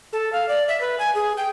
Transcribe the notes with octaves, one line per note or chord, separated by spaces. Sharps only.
A4
F5
D5
E5
B4
G#5
G#4
G5